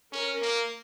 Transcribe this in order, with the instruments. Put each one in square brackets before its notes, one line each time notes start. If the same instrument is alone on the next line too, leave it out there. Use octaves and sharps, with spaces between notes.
[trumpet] C#4 [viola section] A#4
[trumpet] A#3